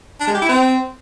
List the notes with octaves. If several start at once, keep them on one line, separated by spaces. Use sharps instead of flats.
D4
G#3
G4
E4
C4